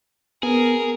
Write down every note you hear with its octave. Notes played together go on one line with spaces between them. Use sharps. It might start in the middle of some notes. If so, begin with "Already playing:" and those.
B3 G#4 A#4